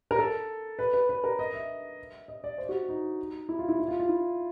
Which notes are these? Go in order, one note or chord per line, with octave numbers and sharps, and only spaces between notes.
A#4
A4
B4
B4
B4
A#4
D#5
E5
D#5
D5
C5
F#4
D#4
E4
F4
E4
E4
F4
F4
E4